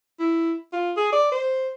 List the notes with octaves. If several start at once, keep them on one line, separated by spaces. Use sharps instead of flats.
E4
F4
G#4
D5
C5